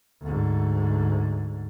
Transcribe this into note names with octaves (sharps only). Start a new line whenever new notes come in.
D2 G#2